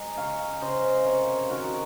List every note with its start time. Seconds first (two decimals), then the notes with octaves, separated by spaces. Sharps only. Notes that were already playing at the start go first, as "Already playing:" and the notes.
Already playing: G#3 D#5 A#5
0.17 C#3 C#5 F5
0.62 C#3 C5 D#5
1.06 C3 A#4 C#5
1.50 D#3 F#4 A#4